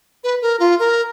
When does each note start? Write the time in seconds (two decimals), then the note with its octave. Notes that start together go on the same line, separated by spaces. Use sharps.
0.24 B4
0.42 A#4
0.60 F4
0.79 A#4